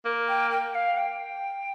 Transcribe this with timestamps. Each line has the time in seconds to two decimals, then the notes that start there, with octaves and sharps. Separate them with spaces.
0.05 A#3
0.28 G5
0.51 G5
0.75 F5
0.98 G5